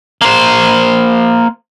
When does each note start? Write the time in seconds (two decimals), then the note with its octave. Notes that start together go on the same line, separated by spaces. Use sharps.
0.21 A#3 C5